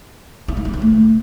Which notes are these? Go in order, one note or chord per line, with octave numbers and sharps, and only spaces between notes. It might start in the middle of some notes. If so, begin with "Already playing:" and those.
E4
F#3
E4
E3
A3